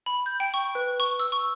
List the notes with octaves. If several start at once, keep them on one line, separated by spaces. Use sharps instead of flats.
B5
G6
G5
C#6
B4
C#6
E6
C#6